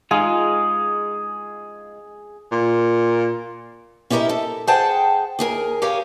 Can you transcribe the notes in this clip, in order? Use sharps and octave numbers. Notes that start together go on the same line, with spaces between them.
G#3 D#4 F4 G#4
A#2
C#4 E4 G4 A4 A#4 D#5
A4
G#4 C5 F#5 G5 A5
D#2 G#4 A#4
G4 A#4 C#5 F5 G#5